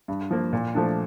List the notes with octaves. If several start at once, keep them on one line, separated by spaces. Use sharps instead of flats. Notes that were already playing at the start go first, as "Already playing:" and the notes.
G2
F3 A#3
A#2
F3 A3 D4